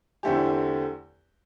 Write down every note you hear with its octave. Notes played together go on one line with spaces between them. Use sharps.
E2 D3 A3 C4 G4